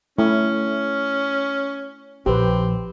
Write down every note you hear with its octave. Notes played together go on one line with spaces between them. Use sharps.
A3 C#4 E4
A#1 C4 G4 B4